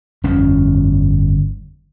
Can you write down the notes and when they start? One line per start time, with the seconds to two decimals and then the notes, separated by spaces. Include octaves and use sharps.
0.24 G1 F2 C#4